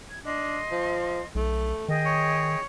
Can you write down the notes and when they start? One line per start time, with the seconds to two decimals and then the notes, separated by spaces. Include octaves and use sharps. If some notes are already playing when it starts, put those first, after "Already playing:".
0.10 G#6
0.25 D4 D#5 C6
0.71 F3
1.35 B1 A3
1.89 D#3 G#4 D#5 G5
2.06 C#5